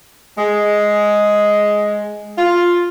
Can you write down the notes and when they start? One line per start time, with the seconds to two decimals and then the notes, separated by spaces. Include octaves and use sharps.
0.37 G#3
2.38 F4